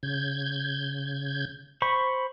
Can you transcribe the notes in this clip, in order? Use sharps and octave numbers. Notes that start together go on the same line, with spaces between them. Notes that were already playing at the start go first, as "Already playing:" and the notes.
C#3 G6 G#6
C5 B5 C#6